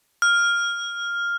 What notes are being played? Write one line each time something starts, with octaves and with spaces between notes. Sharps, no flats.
F6